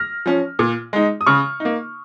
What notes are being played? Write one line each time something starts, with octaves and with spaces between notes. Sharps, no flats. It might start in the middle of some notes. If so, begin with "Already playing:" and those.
Already playing: F6 A#6
F3 C#4
A#2
G#3 D#4
D#6
C#3 C#6 F6
D#4
A#3